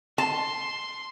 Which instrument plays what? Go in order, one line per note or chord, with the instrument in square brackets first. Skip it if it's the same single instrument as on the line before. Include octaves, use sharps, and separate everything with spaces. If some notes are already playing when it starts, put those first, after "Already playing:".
[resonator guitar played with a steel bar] A5 [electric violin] C6